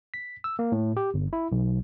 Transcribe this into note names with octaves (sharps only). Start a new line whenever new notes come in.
B6
E6
A#3
A2
G4
G1
E4
B1